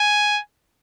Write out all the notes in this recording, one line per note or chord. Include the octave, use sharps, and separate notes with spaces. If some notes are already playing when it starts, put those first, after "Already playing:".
Already playing: G#5